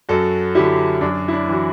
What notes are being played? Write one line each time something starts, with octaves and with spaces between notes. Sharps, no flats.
F#2 F#4 A4
D3 F#3 E4 G4
F#2 D4
E4
D4
E3 F#4